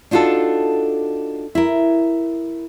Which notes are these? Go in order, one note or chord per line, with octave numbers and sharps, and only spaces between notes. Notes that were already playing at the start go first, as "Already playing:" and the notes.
D4 D#4 F4 F#4 A4
E4 A#4